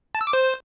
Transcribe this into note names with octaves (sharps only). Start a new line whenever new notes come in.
A5
E6
D6
C5